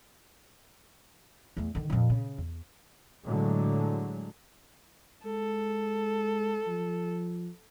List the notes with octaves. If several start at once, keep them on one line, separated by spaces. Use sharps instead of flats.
E2 A3
D3 D#3
F2 A#2
C#3
E2
A2 D3 F#3 G#3
G#3 A4
F3